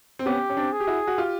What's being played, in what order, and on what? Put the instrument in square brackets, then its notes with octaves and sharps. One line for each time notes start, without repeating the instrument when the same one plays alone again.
[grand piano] C4
[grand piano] B3 C#4 [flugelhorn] G4
[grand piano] C#4
C4 D4
[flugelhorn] G#4
[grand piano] G4
E4 F#4
F#4
F4 G4